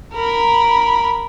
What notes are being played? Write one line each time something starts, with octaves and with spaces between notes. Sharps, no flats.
A#4 B5